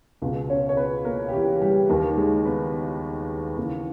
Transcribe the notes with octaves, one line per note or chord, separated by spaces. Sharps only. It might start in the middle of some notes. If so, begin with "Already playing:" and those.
C#2 B2
C#4 C#5
C#5
B3 B4
A#3 A#4
G4
E3 E4
G3 G4
D#2 D#3 A#3 A#4
G#3 G#4
B3 B4
D#2 C#3 E3 A#3 A#4